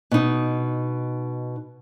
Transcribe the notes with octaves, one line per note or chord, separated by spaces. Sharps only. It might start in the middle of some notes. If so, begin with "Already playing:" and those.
B2 D#4